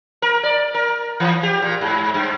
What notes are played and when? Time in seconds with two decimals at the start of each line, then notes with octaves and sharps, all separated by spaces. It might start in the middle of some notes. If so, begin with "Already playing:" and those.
0.22 A#4
0.43 D5
0.74 A#4
1.20 E3
1.43 G4
1.62 A#2
1.81 G#2
2.14 G2